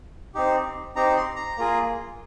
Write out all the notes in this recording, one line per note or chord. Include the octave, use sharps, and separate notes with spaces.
C4 D#4 G4
C4 D#4 G4 A#5
C6
A#5
A#3 F4 G#4